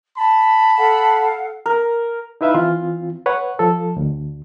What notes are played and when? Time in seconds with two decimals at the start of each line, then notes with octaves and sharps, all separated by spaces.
0.17 A5 B5
0.78 A4 F5 F#5
1.66 A#4
2.41 D#4 E4 B4 E5 F5 B5
2.55 E3 C4 F4
3.26 B4 C#5 F#5
3.59 F3 A4
3.96 D2